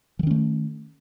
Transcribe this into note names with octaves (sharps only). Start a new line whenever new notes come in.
D#3 F3 A3 C#4